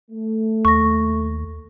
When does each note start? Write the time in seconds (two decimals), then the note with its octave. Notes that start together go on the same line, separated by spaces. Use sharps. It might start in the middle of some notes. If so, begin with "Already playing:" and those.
0.11 A3
0.65 D#2 C#6 A#6